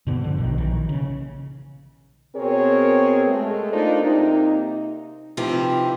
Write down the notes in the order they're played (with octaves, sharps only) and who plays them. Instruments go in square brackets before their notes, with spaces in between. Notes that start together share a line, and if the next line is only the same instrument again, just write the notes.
[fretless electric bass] G2 B2 D3 B3
D3 F3
B1 B2 D#3
A#1 D#3 E3
C#3
[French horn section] B2 C4 G#4 A#4 C#5
G#3 A3
A#3 D4 D#4 F4 C5
C3 A#3 D#4
[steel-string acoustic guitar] C3 E3 F3 D#4 G4